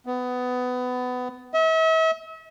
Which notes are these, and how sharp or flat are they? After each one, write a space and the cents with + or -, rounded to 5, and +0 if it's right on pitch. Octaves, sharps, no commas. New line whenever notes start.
B3 +20
E5 -40